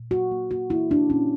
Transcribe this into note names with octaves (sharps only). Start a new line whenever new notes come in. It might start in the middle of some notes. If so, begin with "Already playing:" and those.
Already playing: A#2
A#3 F#4
A#3
A#3 F#4
A#3 E4
A#3 D4
A#2 C#4